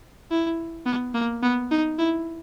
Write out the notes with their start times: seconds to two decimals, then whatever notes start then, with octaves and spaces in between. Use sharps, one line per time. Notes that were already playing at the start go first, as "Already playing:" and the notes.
0.31 E4
0.86 B3
1.14 A#3
1.42 B3
1.71 D#4
1.99 E4